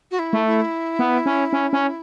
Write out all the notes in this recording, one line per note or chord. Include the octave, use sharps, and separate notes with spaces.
F#4
E4
A3
E4
B3
C#4
C#4
C#4